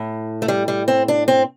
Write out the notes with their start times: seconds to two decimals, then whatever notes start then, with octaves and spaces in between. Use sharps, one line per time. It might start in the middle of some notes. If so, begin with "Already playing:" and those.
Already playing: A2
0.42 A3
0.48 G3
0.68 G3
0.88 C4
1.08 D4
1.28 C4